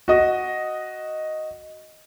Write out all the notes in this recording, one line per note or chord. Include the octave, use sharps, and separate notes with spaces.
F#4 D#5